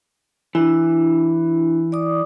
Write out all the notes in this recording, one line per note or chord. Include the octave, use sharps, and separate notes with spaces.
E3 D4 E4
D5 D6 D#6